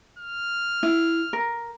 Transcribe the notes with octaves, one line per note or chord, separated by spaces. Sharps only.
F6
E4
A#4